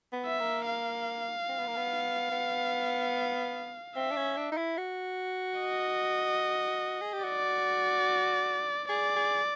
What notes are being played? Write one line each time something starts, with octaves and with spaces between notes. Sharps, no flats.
B3
E5
A#3
F5
C4
B3
A#3
B3
B3
C4 E5
D4
C#4
D4
D#4
E4
F#4
D#5
G#4
G4
F#4 D5
G#4 D5
G#4